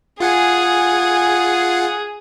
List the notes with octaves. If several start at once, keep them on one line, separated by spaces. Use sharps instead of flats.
F4 G#4 F#5 G#5